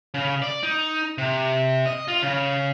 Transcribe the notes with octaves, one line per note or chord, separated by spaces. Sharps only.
C#3
D5
D#4
C3
D#5
F4
C#3